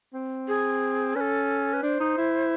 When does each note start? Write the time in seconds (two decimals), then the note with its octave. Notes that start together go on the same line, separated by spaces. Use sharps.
0.14 C4
0.48 G#4
1.16 C#4 B4
1.21 A4
1.73 B4
1.83 D4 C5
2.00 D#4
2.18 E4